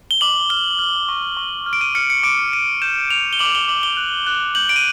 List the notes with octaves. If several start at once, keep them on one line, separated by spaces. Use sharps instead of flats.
G7
D6 F#7
F6 G7
F6
C#6
C#6
F6
D7
D#7
F6 C#7
C#7
D6 D7
D6 D#7
G6 E7
G6 F7
G7
D6 F#7
G7
D6 F#7
G7
F#6
F#6
G6 F#7
D7
D#7